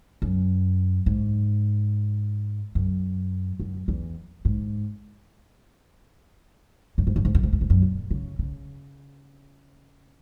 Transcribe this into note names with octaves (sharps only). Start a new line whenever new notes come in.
F#2
G#2
F#2
F#2
E2
G#2
F#2
G#2
F#2
G#2
F#2
G#2
F#2
G#2
F#2
A#2
C#3
C#3